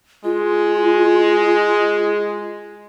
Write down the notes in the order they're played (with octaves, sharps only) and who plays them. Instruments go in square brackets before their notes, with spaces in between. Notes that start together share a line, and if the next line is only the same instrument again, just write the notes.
[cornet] G#3 [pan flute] F4